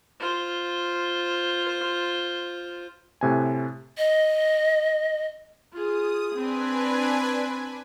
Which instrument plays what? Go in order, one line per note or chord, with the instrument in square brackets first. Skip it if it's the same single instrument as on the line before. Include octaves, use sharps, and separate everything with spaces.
[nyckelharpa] F4 C5
[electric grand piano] A2 C3 G#5
[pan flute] D#5
[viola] F4 G#4 [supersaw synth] D#6
[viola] C4 [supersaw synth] D4 B4 G#5